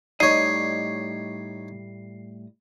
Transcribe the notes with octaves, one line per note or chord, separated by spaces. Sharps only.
A2 G3 D#4 C#5 D#5 C7